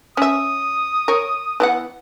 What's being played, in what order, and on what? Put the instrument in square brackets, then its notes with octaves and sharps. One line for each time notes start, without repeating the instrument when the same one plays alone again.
[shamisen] C#4 E5 [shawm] D#6
[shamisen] A#4 C#5
E3 B3 F#5